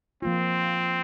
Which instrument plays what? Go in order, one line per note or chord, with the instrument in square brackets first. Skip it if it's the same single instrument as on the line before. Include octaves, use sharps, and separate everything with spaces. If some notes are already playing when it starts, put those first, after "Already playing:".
[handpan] F3 A#3 F4 [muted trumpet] C4